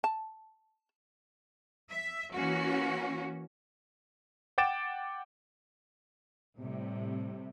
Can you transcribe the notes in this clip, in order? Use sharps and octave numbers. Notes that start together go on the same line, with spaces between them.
A5
E5
E3 A#3 C#4 F#4
F#5 G5 D6 A6 D7 E7
A2 C3 G3